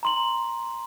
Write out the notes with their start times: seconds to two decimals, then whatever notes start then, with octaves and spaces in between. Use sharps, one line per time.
0.03 A#5 C6 F#7